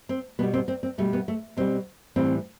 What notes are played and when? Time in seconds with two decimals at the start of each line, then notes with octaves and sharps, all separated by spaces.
0.09 C4
0.39 B2 G3 B3
0.54 C4
0.68 C4
0.83 C4
0.98 B2 G3 A3
1.13 B3
1.28 A3
1.57 B2 G3 C4
2.16 A2 E3 G3 C4